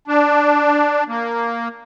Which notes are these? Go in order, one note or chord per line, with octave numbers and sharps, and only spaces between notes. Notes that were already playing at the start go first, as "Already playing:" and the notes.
D4
A#3